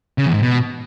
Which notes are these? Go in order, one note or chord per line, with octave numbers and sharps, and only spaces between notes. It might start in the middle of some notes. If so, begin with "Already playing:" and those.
C#3
E2
G#2
B2